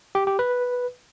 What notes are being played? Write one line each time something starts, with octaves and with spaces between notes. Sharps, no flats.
G4
G4
B4